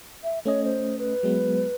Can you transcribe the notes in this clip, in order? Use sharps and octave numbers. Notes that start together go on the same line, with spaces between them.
E5
A3 C#4 C#5 D#5
C5
B4
F#3 G#3 B3